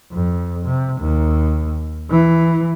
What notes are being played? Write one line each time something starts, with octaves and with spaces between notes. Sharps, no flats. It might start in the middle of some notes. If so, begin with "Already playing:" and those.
F2
C3
D#2
E3